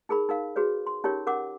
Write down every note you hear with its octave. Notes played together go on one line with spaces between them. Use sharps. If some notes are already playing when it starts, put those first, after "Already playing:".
D#4 G#4 A#4 B5
D#4 A#4 F5
F#4 G#4 B4 C#5
C6
C#4 D#4 F4 G4 A#4 C#5
C#4 A#4 F#5 D6